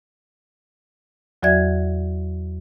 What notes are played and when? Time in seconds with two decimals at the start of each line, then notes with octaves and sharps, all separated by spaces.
1.43 E2 F#3 F#4 D5 E5 G#6